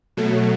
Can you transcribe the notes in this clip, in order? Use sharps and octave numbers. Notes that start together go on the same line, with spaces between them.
B2 F#3 A3